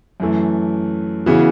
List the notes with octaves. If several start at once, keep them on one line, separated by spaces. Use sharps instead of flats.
F#2 E3 A3
C#3 E3 B3 F#4